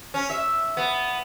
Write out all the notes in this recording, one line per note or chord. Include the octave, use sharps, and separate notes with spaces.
C#4
E5
B3